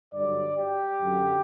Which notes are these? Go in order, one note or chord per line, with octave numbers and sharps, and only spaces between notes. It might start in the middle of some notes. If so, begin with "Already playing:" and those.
G2 D3 F#3 D5
G4
F#2 D3 F#3